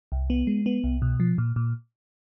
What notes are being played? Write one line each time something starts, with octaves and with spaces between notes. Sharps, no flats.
C2
B3
G#3
B3
C2
B2
F3
A#2
A#2